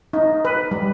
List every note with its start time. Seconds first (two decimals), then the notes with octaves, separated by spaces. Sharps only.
0.13 D#4
0.45 B4
0.71 G3